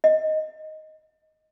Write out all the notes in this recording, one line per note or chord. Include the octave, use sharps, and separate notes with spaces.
D#5